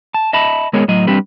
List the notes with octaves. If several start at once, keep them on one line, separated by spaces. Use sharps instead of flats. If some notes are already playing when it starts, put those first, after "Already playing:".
A5
D#5 E5 A5 B5
G#3 B3 G#4 A#4 C#5 D#5
A2 F#3 D#5
G3 C4 D4 G4 B4